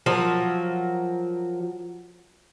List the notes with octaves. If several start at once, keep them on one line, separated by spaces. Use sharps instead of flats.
F3 F#3 A#4